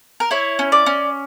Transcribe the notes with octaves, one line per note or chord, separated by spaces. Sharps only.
A#4
E4 C#5
C#4
D5
C#4